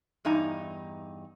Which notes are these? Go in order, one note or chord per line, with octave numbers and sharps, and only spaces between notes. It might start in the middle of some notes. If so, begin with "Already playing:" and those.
E2 G2 D#4 G#5 A#5